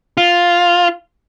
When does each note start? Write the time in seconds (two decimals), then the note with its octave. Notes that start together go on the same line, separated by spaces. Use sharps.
0.17 F4